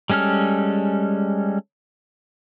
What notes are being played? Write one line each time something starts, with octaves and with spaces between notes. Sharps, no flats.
G3 G#3 C#4 A4 F6